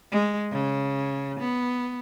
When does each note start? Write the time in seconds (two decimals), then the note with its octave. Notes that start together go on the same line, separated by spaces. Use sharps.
0.12 G#3
0.52 C#3
1.40 B3